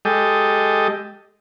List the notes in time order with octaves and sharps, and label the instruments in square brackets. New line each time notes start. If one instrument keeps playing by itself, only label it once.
[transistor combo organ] G#3 G4 A4 D#5